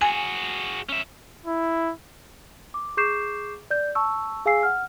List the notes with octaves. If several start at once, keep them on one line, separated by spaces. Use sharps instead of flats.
F#4 G#4 G#5
C#4 E5
E4
D6
G#4 C#6 D6 G6 C7 E7
D5 G6
A5 C#6 E6
G#4 F5 G#5 E6 C7
F#5 F6